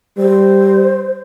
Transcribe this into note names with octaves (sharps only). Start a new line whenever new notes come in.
G3 C5